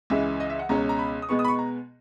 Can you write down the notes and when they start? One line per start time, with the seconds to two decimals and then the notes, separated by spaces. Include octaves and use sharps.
0.10 C#2 C#3 E3 G#3 E5
0.40 D#5
0.50 E5
0.59 F#5
0.69 C#2 B2 G#3 C#4 A#5
0.89 A#5
0.99 B5
1.22 D#6
1.29 B2 G#3 B3 C#6
1.39 D#6
1.45 B5
1.48 C#6
1.59 A#5